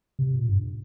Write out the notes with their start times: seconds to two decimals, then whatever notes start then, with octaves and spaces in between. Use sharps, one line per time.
0.19 C3
0.34 A#2
0.49 G2